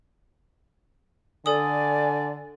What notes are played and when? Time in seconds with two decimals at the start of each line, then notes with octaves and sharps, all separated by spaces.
1.46 D3 A4 D5 G#5 D#6